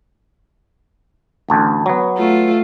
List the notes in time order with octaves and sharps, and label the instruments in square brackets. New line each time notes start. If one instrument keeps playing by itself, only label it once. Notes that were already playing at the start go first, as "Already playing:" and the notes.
[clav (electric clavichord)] A1 D2 A5
F#3 B3
[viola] A3 F4